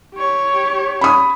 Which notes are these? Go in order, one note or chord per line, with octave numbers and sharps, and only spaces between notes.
G4 C#5
B5 D#6